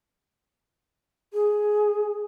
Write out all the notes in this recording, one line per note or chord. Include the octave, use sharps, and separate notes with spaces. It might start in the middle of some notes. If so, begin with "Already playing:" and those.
G#4